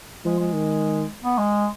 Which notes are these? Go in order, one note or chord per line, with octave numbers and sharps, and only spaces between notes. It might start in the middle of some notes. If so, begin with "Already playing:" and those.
F3 G#3
G#3
D#3
B3
G#3